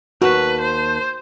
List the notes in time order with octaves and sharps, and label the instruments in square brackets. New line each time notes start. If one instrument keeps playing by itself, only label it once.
[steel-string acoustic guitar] D#2 A5 [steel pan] F#4 [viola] B4
[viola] C5